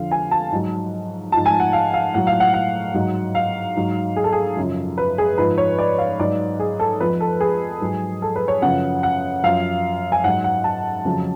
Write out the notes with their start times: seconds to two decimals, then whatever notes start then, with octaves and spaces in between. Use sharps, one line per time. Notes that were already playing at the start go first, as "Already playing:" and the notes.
Already playing: F2 D3 F3 F5
0.11 G#5
0.31 A5
0.52 G#2 F#3
1.32 G#2 F3 A5
1.46 G#5
1.60 F#5
1.73 F5
1.94 F5
2.14 A2 F#3 F#5
2.27 F5
2.40 F#5
2.54 F#5
2.94 G#2 F#3
3.35 F5
3.76 G#2 F#3
4.16 G#4
4.24 A4
4.32 G#4
4.57 F#2 C#3 F3
4.98 B4
5.18 G#4
5.38 G#2 F3 B4
5.58 C#5
5.79 D5
5.98 F5
6.20 G#2 F#3 D5
6.60 G#4
6.80 A4
7.00 F2 F3 B4
7.21 A4
7.40 G#4
7.81 G#2 F#3
8.22 A4
8.36 B4
8.48 C#5
8.62 F#2 C#3 F3 F#5
9.03 F#5
9.43 F#2 F3 F5
10.12 G#5
10.24 G#2 F#3 F#5
10.44 F#5
10.64 A5
11.05 F2 C#3 F#3